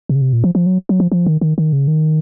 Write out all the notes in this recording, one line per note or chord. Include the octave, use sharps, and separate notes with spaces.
C3
C#3
C3
A#2
F3
F3
F#3
F#3
F3
F3
D#3
D#3
D#3
C#3
D#3